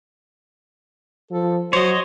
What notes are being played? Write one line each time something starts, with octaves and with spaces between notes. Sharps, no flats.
F3 A4
F#3 C5 C#5 D#5